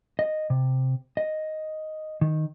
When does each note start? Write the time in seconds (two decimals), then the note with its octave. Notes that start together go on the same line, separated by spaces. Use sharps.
0.19 D#5
0.50 C3
1.17 D#5
2.21 D#3